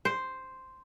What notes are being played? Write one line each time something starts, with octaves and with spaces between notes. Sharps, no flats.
C5